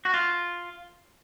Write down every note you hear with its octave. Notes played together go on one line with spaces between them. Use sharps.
F#4
F4